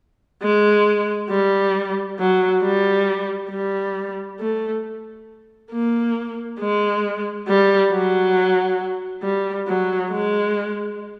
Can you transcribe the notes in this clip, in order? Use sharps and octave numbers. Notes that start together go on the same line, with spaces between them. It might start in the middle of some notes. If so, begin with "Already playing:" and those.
G#3
G3
F#3
G3
G3
A3
A#3
G#3
G3
F#3
G3
F#3
G#3